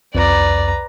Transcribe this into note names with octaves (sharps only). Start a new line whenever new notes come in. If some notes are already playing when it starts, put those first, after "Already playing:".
C2 F2 B4 D5 A#5